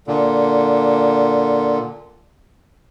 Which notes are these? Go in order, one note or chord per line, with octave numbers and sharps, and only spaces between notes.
A#2 D3